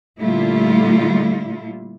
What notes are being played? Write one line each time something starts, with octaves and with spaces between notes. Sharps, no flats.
A#2 D3 G3 A3 E4 F4